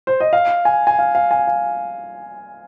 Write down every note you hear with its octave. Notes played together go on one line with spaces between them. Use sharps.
C5
D#5
F5
G#5
G#5
F5
F5
G#5
F5